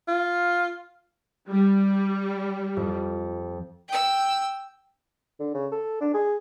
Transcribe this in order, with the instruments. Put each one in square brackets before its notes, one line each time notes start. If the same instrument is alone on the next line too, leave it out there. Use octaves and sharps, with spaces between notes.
[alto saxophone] F4
[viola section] G3
[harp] F2
[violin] G5 E6
[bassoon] D3
C#3
A4
D4
G#4